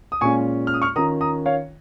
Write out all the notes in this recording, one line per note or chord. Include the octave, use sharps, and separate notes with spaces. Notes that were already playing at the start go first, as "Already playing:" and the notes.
D#6
A#2 G#3 C#4 F4 G#5 C#6
F6
D#6
C#6 F6
D#3 C#4 F4 A#5 D#6
A#5 D#6
C#5 F5